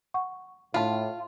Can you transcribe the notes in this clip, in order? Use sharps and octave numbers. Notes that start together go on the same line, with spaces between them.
F#5 C#6
A2 F4 A5 B5